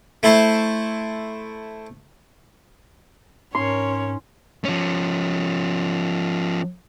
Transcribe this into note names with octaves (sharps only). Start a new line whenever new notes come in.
A3 E4 C5 A5
G#2 C#4 A#4 C#5 C6
F3 C#4